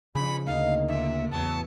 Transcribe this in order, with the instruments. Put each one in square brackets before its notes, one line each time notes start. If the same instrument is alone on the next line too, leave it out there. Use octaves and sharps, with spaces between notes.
[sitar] G2 [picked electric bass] C#3 [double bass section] F3 [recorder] B5
[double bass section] D2 A#3 [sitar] D#4 [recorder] F5
[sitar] D#2 A2 [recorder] E5
[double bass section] A1 E2 [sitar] F#3 B3 [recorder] A5